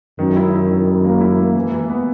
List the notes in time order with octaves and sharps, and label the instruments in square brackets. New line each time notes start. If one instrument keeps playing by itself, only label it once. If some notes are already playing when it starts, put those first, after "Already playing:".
[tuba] F#2 [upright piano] D#3
[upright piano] E4
E4
D#3
D#3
A#3
E4
A#3
E3
E3
B3